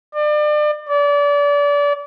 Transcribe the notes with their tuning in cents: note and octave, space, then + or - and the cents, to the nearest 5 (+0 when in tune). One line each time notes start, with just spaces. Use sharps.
D5 +35
D5 -30